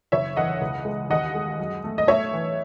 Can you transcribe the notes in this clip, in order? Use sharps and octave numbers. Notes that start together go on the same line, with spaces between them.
F#1 C#5 E5
E2 D#5 F#5
C#2
G#3
D#2 D#5 F#5
G#3
F#2
A3
D#5
A3 C#5 E5
E3